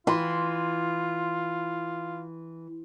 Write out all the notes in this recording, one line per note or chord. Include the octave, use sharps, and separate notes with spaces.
E3 F4 C6